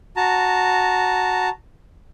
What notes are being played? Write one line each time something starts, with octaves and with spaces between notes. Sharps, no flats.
F#4 A5 A#5